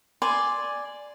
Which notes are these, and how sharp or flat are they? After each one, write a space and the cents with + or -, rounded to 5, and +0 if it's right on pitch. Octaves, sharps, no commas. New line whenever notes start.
D5 +0 G#5 +0 C6 +0